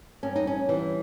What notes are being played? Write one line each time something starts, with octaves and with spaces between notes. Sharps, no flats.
G2 C#4
D#4
C#4
E3 G3